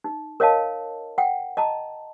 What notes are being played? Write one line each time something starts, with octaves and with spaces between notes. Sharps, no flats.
D#4
A#4 C#5 D#5 F5 A5
F#5 G5
D#5 A5 A#5